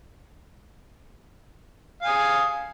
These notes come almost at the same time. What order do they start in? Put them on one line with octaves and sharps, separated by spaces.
F5 G#5 D#6